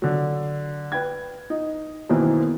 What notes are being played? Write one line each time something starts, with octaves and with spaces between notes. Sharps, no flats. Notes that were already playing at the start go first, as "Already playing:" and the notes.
D3 F#3
B4 G5 G#6
D#4
F#2 B2 D#3 E3 A#3 C4